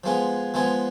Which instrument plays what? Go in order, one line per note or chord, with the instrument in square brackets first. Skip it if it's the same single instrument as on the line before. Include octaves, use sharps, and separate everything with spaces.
[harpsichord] F3 G#3 B3 F4 G#4
F3 G#3 B3 F4 G#4